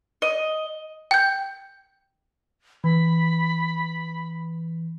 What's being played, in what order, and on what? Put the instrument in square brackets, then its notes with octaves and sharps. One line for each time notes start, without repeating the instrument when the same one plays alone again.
[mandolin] D#5
[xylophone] G5 G6
[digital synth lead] E3 [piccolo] B5